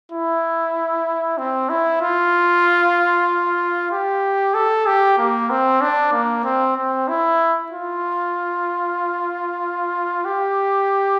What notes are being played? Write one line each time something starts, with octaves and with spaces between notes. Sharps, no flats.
E4
C4
E4
F4
G4
A4
G4
A#3
C4
D4
A#3
C4
C4
E4
F4
G4